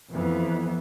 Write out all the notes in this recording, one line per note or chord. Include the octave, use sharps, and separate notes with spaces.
F2 E3 B3